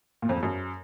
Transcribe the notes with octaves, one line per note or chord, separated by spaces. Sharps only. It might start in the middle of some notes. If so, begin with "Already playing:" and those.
A#2
F2
E2
F#2